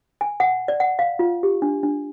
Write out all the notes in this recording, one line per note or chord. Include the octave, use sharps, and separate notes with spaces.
G#5
F#5
D5
F#5
F5
F4
G4
D4
D4